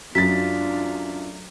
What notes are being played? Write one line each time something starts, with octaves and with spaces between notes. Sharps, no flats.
F#2 F#3 A3 D4 F4 A6 B6